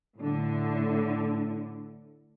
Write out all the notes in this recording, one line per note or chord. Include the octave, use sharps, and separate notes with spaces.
A2 D3